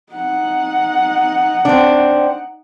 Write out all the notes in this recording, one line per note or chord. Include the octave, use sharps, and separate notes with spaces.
D#4 F#5
C4 D4